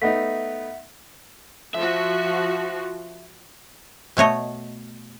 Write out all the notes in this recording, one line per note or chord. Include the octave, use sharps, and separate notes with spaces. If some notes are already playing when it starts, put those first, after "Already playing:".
A3 B3 D#4 E5 F#5 B6
F3 F#4 E5
B2 A3 C#5 D#5